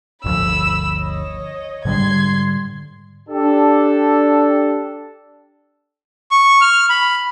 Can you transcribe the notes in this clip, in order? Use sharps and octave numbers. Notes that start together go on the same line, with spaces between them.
G1 D2 F3 B5 E6
C#5 D#5
G#2 D3 G3 C6 G#6
D4 G4 A4
C#6
F6
B5